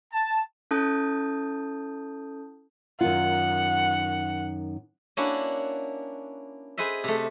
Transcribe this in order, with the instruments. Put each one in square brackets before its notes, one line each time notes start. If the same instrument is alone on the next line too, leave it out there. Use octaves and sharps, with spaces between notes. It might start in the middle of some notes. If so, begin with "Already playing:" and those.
[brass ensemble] A5
[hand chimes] C#4 E4 A4 A5 D#6 G6
[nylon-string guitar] F#2 D#3 F4 [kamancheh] F#5
[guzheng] A#3 C#4 D4 E4 F#4
G#4 B4 C5 D#5 E5
C3 A3